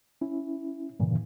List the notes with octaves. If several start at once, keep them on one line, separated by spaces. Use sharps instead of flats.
C#4 E4
G2 A#2 C#3 E3